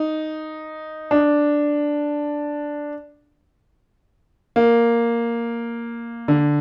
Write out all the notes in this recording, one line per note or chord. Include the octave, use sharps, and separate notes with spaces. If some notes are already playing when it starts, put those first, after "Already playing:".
Already playing: D#4
D4
A#3
D3